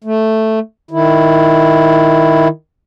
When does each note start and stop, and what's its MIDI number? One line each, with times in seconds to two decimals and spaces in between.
0.04 0.59 57
0.91 2.48 51
0.91 2.48 64